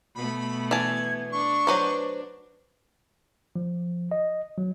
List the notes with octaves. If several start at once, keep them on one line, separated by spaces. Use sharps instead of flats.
B2 A3 B3 B5
E3 A5 G#6
D4 C#6
F#3 B4 C5
F3
D#5
F#3